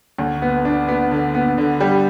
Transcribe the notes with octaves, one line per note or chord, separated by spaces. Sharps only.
D2
B3
D4
B3
D3
B3
D3
G3